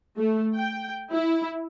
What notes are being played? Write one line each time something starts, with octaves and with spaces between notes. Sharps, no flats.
A3
G5
E4